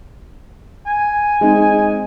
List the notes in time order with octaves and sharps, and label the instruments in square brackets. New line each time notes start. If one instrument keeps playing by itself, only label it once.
[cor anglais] G#5
[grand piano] G#3 C4 D#4